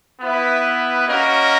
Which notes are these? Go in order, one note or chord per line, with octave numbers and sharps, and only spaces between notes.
B3 E4 B4 E5
A#3 C#4 F#4 A#4 D#5